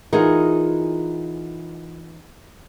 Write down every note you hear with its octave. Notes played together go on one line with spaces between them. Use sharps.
E3 D#4 F4 G#4 A#4 F#5